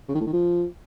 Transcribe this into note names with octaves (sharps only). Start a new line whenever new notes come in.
C#3
D#3
A2
D#3
F3